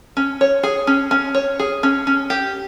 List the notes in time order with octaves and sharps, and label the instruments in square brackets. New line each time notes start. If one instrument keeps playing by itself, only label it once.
[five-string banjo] C#4
C#5
G#4
C#4
C#4
C#5
G#4
C#4
C#4
G4